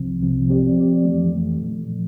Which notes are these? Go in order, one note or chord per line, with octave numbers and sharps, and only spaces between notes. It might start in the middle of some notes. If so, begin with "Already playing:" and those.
Already playing: C2 C3 F3 C4
C2 C3 F3 C4
F3 C4 G4 D5
F3 C4 G4 D5
F2 E3 A3
F2 E3 A3
A#2 F3 A3
A#2 F3